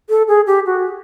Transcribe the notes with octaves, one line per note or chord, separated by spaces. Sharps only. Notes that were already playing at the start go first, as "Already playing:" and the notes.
A4
G#4
G4
F#4